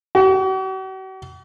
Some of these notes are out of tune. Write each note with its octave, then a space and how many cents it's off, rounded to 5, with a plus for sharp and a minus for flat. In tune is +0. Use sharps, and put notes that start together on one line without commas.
F#4 +45